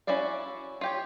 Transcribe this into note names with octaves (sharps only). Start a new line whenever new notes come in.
C#4 E4 F#4 D5 F5
F4 G4 C#5